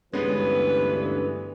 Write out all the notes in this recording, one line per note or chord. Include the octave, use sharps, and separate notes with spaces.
D2 G2 E3 G#3 B3 C#4 B4